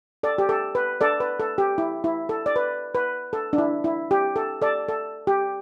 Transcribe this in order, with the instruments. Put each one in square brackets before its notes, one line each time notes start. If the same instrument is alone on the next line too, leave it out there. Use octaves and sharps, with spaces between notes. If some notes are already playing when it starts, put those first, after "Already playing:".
[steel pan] A4 D5
G4
A4
B4
A4 D5
B4
A4
G4
E4
E4
A4
D5
B4
B4
A4
D4
E4
E4
G4
A4
A4 D5
A4
G4